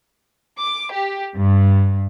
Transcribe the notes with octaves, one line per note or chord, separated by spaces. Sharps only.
D6
G4
G2